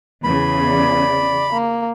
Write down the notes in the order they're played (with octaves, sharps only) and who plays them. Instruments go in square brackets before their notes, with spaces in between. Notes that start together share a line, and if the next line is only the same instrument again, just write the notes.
[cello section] E2 C#3 [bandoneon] B5
[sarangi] D5
A#3